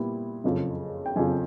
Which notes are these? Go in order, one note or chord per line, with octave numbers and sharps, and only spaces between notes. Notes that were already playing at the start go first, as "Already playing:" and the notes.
Already playing: A#2 G3 B3 E4
F#1 F2 C#3 F3
G5
F#1 F2 C#3 F3 G#5